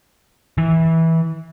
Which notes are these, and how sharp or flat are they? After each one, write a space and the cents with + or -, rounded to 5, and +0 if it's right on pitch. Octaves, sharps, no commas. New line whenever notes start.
E3 -15